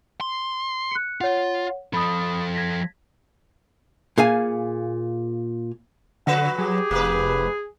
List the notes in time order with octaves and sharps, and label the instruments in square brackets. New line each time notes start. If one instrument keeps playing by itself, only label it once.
[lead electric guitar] C6
[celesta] F#6 C#7
[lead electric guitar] F4 [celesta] C#5 F#5
[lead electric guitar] F3 A4 [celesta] B5 D#6
[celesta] G#6 A#6 B6
[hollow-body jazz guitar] A#2 G#4 F5 G#5
[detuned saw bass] D3 [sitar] F3 F#4 B4 [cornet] F#5
[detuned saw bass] F#3 [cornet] G4 [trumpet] G#4
[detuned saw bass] F1 [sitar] A#3 B4